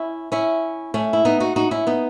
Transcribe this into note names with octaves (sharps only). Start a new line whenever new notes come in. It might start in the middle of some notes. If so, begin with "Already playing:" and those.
Already playing: C#4 E4
C#4 E4
A3 C#4
E4
B3 D#4
D#4 F#4
D#4 F#4
C#4 E4
B3 D#4